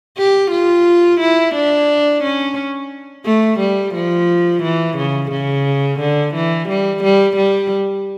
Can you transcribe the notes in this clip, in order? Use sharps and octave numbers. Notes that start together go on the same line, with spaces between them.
G4
F4
E4
D4
C#4
A3
G3
F3
E3
C#3
C#3
D3
E3
G3
G3
G3